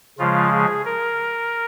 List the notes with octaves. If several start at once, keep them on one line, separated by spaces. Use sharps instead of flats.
C#3 F3 G#3 F4
G#4
A#4